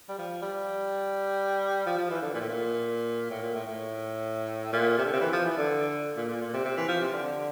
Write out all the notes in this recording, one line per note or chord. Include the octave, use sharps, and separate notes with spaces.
G3
F3
G3
F3
F3
E3
D3
A#2
A2
A#2
A2
A#2
A2
A2
A#2
C3
D3
C3
E3
F3
E3
D3
A#2
A#2
A#2
C3
C3
E3
F3
C3
D3